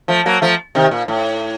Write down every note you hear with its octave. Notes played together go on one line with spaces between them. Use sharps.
F3 A3
F#3 A#3
F3 A3
C3 D#3
A#2
A2